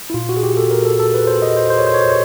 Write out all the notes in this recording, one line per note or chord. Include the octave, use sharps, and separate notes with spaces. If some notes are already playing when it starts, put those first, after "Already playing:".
E4
A#2 F4
F#4
G#4
G4
A4
A#4
A4
A4
B4
C5
D#5
C5
C5
C#5
C5
C#5
C5
C#5